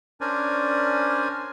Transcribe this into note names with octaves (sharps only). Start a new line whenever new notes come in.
C#4 D4 A#4 C5 D5 G#5